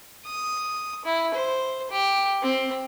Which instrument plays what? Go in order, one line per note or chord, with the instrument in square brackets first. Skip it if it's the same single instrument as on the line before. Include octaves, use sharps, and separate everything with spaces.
[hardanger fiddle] D#6
E4
C5
G4
C4